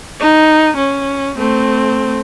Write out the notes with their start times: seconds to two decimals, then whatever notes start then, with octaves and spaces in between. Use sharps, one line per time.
0.19 D#4
0.76 C#4
1.36 A3 C4